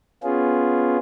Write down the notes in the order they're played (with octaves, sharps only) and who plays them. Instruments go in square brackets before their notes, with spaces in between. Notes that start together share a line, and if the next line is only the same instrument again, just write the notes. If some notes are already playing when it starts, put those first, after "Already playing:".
[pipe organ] B3 C#4 F4 G#4